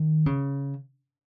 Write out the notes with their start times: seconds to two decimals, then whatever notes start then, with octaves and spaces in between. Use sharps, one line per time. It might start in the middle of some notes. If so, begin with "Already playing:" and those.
Already playing: D#3
0.26 C#3